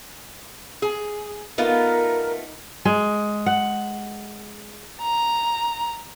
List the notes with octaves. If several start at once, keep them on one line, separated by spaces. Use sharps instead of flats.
G#4
A3 B3 D#4 F4 A#4
G#3
F#5
A#5